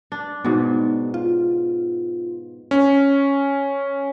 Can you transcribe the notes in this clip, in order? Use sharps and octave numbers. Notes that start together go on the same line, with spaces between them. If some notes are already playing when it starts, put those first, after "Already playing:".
D4
G#2 B2 B3
F4
C#4